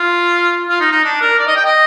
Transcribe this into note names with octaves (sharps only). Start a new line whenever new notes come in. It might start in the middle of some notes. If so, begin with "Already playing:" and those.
Already playing: F4
F4
D#4
D#4
D4
A#4
D5
D#5
G5
D#5